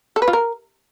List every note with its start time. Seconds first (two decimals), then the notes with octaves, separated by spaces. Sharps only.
0.16 A4
0.22 B4
0.28 F4
0.33 A#4